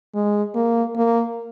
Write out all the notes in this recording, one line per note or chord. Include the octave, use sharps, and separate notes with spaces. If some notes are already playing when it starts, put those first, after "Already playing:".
G#3
A#3
A#3